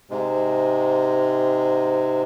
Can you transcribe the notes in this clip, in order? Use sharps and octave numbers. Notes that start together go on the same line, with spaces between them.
G#2 C3 G#3